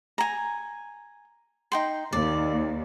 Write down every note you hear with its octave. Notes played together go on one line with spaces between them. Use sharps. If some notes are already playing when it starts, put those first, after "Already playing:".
G#5 A#5
D#4 G5 C6
D#2 D5